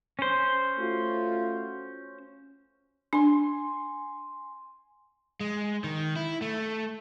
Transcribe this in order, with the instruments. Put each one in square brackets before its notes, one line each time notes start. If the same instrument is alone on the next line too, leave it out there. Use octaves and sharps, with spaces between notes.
[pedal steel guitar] C#4 C5
[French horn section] A3 F4 F#4
[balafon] D4 [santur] G#5 C6
[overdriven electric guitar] G#3
D#3
E4
A3